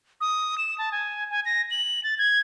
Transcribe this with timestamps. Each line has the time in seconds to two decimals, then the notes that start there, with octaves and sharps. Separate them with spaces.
0.21 D#6
0.58 E7
0.78 A5
0.92 G#5
1.30 G#5
1.45 A#6
1.71 F#7
2.04 A6
2.18 G#6